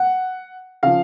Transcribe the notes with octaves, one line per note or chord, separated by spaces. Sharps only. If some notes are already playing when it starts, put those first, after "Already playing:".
Already playing: F#5
C#3 F3 F5